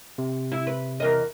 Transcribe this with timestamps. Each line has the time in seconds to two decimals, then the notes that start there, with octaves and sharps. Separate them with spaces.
0.18 C3
0.52 E4
0.67 B4
1.00 E2 A#4 D#5